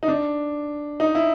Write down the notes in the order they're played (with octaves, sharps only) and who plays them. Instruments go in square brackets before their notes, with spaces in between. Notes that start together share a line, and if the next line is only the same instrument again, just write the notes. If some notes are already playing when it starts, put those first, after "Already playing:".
[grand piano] D#4
D4
D#4
E4